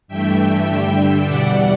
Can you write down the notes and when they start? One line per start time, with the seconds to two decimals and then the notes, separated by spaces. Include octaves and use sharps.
0.08 G2 E3 A3 E5 G5
0.38 E5 G5
0.67 G2 D3 G3
1.26 E2 B2 G3 D5 F#5